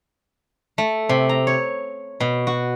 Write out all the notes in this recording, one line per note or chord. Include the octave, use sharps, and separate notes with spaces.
A3
C3
A#5
C#5
B2
F#4